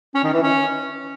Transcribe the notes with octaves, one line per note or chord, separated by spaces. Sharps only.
C#4
D#3
E3
C#4